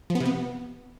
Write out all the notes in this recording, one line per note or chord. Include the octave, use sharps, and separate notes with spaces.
F3
B3
C3
B3